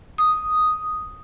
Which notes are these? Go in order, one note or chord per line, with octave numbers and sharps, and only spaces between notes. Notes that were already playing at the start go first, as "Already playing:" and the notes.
D#6